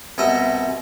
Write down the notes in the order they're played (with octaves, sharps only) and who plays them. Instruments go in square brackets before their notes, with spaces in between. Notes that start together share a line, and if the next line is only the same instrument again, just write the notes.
[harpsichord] C2 B2 D#5 E5